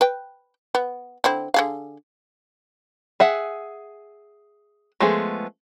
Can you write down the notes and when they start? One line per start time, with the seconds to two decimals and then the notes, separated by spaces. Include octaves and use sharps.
0.01 B4 G5
0.75 B3
1.24 D3 C4 E4
1.54 D3 G#4 F5
3.20 G#4 E5 F#5
5.00 F3 G#3 A3 B3 G#4